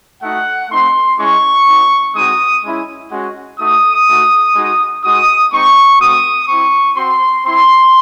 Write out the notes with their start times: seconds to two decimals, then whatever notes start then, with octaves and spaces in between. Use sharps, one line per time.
0.21 A3 D#4 F#4 F#5
0.70 A3 C4 D#4 C6
1.18 G#3 C#4 E4 C#6
1.66 C4 D#4 F#4
2.14 G#3 C4 D#4 F#4 D#6
2.63 G#3 C#4 E4
3.10 G#3 C#4 F#4
3.59 A3 D#4 F#4 D#6
4.07 A3 D#4 F#4
4.55 G#3 D#4 F#4
5.03 G#3 D#4 F#4 D#6
5.51 G#3 C4 D#4 C#6
5.99 A3 C4 F#4 D#6
6.47 C4 E4 C#6
6.96 C4 F#4 C6
7.44 C4 E4 C6